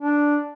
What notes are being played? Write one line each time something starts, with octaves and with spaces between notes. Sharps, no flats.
D4